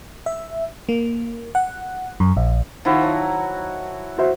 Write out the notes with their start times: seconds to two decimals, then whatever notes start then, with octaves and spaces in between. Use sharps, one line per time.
0.26 E5
0.89 A#3
1.55 F#5
2.20 F#2
2.37 A#1
2.85 D#3 F3 E4 F#4
3.03 F#3
4.18 F#4 C5 E5